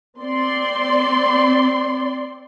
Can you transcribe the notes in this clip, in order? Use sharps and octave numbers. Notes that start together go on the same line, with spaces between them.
C4 D5 C6